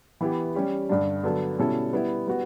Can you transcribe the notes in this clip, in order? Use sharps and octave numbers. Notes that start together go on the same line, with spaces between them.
E3 B3 E4 G4
G3 C#4 G4
G2 D3 G3 D4
D3 F#3 B3 D4 A4
B2 G3 C#4 E4 A4
G3 B3 E4
G3 B3 F#4